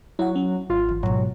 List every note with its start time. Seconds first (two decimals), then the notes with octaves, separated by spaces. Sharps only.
0.19 F#3 E4 F#5
0.36 C#4
0.70 G#1 F4
0.89 E3
1.03 G#2 B2 F#3